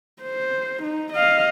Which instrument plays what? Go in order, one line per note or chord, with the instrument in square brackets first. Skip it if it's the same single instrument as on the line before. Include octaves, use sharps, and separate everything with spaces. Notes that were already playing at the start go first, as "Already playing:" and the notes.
[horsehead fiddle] C5
D#4
D#5 F5